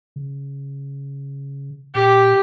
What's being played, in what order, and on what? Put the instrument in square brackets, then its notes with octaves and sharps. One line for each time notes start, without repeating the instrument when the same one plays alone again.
[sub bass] C#3
[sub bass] A#2 [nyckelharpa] G4